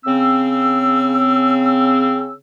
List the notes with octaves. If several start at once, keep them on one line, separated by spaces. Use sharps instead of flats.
C#3 C4 E6